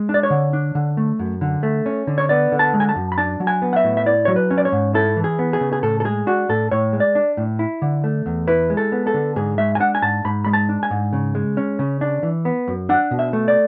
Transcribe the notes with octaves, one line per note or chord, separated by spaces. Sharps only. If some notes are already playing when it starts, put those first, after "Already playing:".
Already playing: G#3
D4
D5
C#5
D3
D4
D3
A3
F#2
D3
A3
C#4
D3
C#5
B3 D5
D3
A5
G#3
G#5
A5
F#2
B5
D4 A5
F#3
G#5
B3
F#5
E5
A2
E5
E4 D5
F#3 C#5
B4
C#4
D5
C#5
G#2
E4 A4
E3
G#4
B3
G#4
C#3
G#4
A2 A4
A4
G#3 G#4
D4 F#4
A2 A4
A2 C#5
G#3
D5
D4
A2
E4
D3
A3
E2
E4 B4
G#3
A4
B3
A4
D3
G#2 G#4
G#3 E5
G#5
D4 F#5
G#5
G#2 A5
G#2 B5
G#3 B5
A5
D4
G#5
G#2
C#3
G#3
C#4
C#3
D4
E3
B3
F#2
D4 F#5
B2
E5
A3
D5